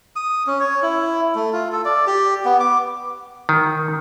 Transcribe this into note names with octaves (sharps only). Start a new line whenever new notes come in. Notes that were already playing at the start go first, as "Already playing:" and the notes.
D#6
C#4
C#5
E4
A3
F4
A4
D5
G4
B3
D6
D#3